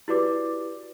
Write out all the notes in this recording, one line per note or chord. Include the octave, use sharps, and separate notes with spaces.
E4 F#4 G4 B4 D5 D6